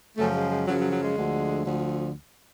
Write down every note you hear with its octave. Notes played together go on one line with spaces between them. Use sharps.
F#2 C#3 F3 A3
G#3
G#3
F#2 C#3 F3 F#3
F#3
F#3
G#3
D2 D3 F3
D2 D3 F3